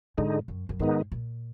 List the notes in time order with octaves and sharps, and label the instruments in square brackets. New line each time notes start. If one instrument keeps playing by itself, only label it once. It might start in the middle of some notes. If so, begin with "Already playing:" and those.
[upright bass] G#2 [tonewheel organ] D3 G#3 D#4
[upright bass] F#2
F#2
[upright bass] G#2 [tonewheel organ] D#3 G#3 B3 D#4
[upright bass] A#2